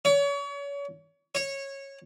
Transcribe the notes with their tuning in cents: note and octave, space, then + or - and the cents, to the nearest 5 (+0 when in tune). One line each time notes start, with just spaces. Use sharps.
C#5 +35
C#5 -15